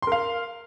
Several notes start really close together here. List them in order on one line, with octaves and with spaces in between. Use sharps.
C6 A#4 F5